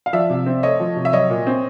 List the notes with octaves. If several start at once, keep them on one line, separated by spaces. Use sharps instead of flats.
F5
F3 D5 E5
C3
C4
A3 C#5 D#5
F3
C3
E5
F#3 C#5 D#5
A#2
C4